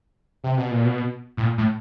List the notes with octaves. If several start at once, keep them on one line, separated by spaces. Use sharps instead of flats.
C3
B2
A#2
B2
A2
A#2
A2